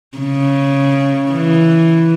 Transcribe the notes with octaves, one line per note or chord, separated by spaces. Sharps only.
C#3
E3